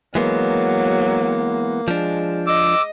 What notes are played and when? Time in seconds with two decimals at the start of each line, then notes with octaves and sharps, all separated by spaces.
0.15 E3 F#3 G#3 A#3 B3
1.88 F3 G#3 D4
2.47 D#5 D6 E6